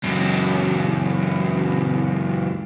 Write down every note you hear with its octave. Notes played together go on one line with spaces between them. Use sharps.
C#2 F#2